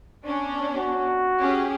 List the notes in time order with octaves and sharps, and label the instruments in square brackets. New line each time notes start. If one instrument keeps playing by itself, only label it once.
[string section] B3 C#4 D4
[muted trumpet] F#4
[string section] C#4 G4 G#4